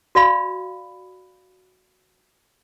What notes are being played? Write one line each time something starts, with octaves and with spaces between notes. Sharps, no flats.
F#4 D5 F5 B5